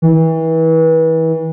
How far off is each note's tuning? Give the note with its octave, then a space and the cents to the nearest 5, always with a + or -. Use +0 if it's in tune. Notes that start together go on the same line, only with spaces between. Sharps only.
E3 -30